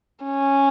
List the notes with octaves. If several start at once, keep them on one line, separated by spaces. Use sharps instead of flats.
C#4